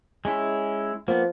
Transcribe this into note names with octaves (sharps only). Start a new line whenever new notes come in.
G#3 C#4 E4
F3 A#3 B3